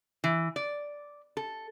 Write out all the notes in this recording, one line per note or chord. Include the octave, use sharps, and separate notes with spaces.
E3
D5
A4